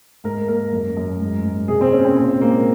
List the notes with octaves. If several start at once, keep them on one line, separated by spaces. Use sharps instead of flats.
G#2 A#4
A#3 A#4
F#2
F#2
G#2
G#2
C3 G#4
C4
A#3 C#4
C4
A#2 C4
G#3 A#3